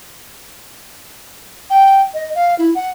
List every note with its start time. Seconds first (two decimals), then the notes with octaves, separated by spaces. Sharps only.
1.70 G5
2.14 D#5
2.35 F5
2.59 E4
2.75 F#5